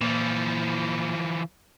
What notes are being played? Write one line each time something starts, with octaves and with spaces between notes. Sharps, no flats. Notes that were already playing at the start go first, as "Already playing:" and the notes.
A#2 E3 F3